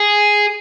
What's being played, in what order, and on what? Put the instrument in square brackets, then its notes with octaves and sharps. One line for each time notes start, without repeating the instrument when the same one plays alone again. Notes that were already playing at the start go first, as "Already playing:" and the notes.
Already playing: [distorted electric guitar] G#4